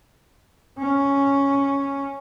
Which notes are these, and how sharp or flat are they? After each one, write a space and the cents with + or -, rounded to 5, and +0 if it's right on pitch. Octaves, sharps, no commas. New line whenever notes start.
C#4 +0